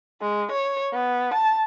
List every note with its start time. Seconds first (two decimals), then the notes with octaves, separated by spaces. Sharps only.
0.21 G#3
0.52 C#5
0.93 B3
1.34 A5